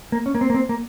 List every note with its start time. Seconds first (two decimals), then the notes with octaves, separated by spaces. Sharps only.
0.12 A#3
0.26 C#4
0.35 A#3
0.41 C4
0.50 A#3
0.54 C4
0.69 A#3